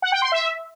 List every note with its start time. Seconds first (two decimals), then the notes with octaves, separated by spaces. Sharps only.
0.02 F#5
0.12 G5
0.22 C6
0.32 E5